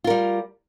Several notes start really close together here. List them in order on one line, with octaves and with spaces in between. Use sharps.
F4 A#4 G3